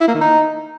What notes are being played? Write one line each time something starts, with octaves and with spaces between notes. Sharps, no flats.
E4
A#3
D#3
D#4